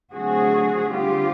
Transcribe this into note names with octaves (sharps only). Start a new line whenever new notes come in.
D3 F#3 A3 C4 F#4 G#4
D3 G3 C4 F4 G4